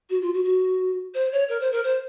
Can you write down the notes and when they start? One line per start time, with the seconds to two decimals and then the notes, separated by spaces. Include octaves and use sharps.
0.09 F#4
0.21 F4
0.34 F#4
0.44 F#4
1.14 C5
1.32 C#5
1.49 A#4
1.60 C5
1.72 A#4
1.84 C5